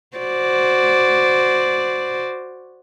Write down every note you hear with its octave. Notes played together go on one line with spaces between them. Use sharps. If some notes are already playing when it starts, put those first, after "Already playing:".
F#4 C5 D5